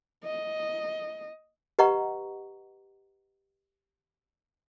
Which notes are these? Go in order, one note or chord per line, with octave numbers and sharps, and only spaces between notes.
D#5
G4 B4 D#5 F#5 A#5 C#6